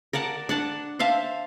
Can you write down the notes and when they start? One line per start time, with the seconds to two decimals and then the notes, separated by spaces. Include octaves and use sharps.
0.13 A#4 D5 F#5 A5
0.49 D4 F#5 A5
0.99 C5 E5 F5 A5